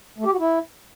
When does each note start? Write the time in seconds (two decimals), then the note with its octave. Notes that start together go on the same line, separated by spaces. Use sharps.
0.18 A3
0.25 G4
0.32 F#4
0.39 E4